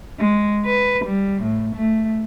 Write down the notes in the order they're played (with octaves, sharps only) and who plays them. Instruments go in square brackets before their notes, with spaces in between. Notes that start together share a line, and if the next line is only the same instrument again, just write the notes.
[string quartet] G#3
B4
G3
A2
A3